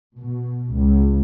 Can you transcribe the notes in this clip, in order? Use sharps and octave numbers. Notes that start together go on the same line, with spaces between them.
B2
C#2